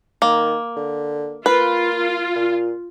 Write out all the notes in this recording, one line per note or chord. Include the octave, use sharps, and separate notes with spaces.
D#3 A#3
D3
A#3 F4 B4
A#2